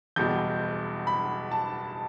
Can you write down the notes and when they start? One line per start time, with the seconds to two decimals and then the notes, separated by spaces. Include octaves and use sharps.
0.16 F#1 E2 B2 G3 G6
1.07 B5
1.51 A5